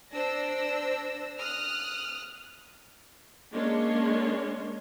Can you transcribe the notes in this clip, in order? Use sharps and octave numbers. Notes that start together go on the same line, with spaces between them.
D4 C5 E6 A#6
D#6 F6 F#6
G#3 A#3 C#4 D4 C#5 C6